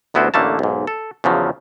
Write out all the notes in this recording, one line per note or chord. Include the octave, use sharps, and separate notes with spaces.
A1 D2 B3 E4 F#4 C5
A1 D3 A3 A#3 A5
B1 G#2
A4
E2 C#3 F3 F#3